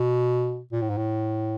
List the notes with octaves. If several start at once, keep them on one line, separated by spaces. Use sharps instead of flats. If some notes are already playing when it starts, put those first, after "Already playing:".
Already playing: B2
A#2
A2
G#2
A2